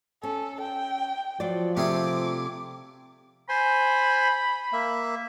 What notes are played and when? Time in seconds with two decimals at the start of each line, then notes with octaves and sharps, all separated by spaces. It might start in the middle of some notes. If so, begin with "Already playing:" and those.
0.23 C#4 A4
0.61 G5
1.40 F3 F#3 F4 D5
1.77 C3 A3 C4 G#4 D6
3.49 C5 G#5 B5 C6
4.73 A#3 E5